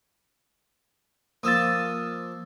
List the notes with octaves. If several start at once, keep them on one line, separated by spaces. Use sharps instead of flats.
F3 A#3 D#6 E6 A6